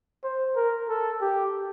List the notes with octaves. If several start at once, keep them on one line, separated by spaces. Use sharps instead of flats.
C5
A#4
A4
G4